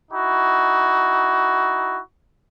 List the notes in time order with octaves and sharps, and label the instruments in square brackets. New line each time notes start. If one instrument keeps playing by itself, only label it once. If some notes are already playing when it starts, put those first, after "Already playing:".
[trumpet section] D#4 E4 F#4